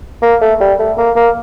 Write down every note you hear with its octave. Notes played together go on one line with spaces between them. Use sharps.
A#3
A3
G3
A3
A#3
A#3